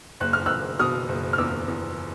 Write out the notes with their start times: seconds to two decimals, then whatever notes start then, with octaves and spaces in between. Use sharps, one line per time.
0.20 F#1 F#6
0.33 F6
0.46 F#1 E6 F#6
0.79 B2 D#6 F6
1.09 F#1
1.33 F6
1.38 E2 D6 E6
1.68 E2